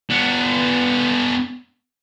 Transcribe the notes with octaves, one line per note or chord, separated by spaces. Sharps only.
B3 D4